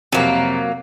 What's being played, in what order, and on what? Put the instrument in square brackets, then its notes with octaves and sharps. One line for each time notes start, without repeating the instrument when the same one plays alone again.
[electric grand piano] F2 C3 [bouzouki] F#3 A#3